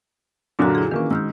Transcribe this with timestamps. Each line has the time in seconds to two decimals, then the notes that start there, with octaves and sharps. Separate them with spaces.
0.59 F#2 A#2 D3 D4 F4 F#4
0.75 E4 G#4
0.91 D#3 E3 A#3 C#4
1.11 G#2 E6 F6 G6